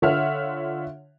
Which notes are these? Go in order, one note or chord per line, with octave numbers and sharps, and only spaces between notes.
D3 F4 C#5 E5 F#5 F6